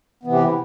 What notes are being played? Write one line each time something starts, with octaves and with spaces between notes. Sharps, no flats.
C3 E3 B3
G4
E4